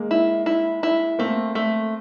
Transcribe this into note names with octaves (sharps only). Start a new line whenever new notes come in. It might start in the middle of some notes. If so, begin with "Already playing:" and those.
Already playing: G#3 A#3
E4
E4
E4
A3 A#3 C4
A3